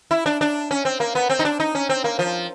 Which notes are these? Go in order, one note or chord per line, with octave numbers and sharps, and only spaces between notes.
E4
D4
D4
C#4
C4
A#3
B3
C4
D#4
D4
D#4
C#4
C4
A#3
F3